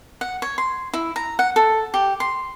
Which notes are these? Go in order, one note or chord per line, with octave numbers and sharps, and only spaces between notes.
F#5
C#5
C6
E4
A#5
F#5
A4
G4
C6